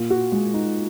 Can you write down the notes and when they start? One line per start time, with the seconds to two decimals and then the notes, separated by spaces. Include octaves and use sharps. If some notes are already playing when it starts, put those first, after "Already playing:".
Already playing: A#2
0.10 F#4
0.32 G#3
0.54 D#4